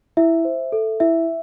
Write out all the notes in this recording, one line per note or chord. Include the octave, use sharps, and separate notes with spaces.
E4 E5
C5
A4
E4 E5